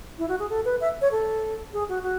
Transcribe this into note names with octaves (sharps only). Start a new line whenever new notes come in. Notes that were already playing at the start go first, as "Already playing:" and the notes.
E4
F#4
G#4
A4
B4
E5
C#5
A4
G#4
F#4
F#4